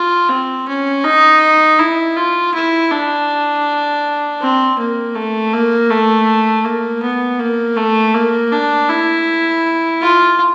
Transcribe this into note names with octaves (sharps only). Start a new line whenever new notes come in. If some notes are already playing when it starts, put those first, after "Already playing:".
Already playing: F4
C4
C#4
D#4
E4
F4
E4
D4
C4
A#3
A3
A#3
A3
A#3
B3
A#3
A3
A#3
D4
E4
F4